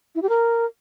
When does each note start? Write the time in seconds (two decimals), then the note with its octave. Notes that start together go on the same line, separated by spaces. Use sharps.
0.15 E4
0.22 G4
0.29 A#4